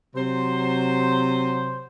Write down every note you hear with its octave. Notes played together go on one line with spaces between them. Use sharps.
C3 F#3 C5